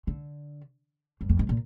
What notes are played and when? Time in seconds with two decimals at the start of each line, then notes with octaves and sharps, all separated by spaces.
0.07 D3
1.21 G2
1.29 F2
1.39 G#2
1.49 A#2